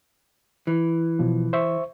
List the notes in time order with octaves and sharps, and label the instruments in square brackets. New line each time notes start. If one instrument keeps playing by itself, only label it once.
[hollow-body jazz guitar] E3
[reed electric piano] B2 F3
C5 E5 C#6